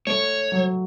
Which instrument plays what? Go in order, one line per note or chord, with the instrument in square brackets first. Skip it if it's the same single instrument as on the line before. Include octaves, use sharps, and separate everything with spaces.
[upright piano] A3 [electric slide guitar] C#5
[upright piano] F#3